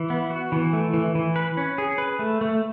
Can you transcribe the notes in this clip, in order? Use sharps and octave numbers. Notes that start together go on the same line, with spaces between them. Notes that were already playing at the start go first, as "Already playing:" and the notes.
Already playing: E3
B3
F#4
E3
A3
E3
E3
B4
C#4
G#4
B4
A3
A3